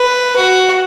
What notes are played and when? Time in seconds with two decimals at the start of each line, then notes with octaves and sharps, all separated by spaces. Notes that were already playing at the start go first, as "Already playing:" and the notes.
Already playing: B4
0.36 F#4